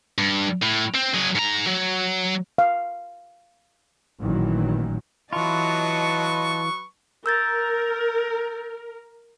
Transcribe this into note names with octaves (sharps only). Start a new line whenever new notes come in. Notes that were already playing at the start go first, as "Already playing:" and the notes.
G2
A2
C4
F#3 G#4
G#2 A#5
F#3
F5
A1 A#2 D#3 E3 F#3
E3 F#3 F4 B4 D#5 A5 C#6
A#4 E6 G6 A6